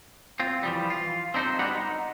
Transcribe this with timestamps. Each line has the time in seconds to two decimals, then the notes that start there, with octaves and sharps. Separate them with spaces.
0.40 C4 F4
0.63 E3 F3 G3
0.90 F4
1.34 C4 D4 D#4 A4 C5
1.59 G3 B3 D4 F#4 F#5
1.75 D#4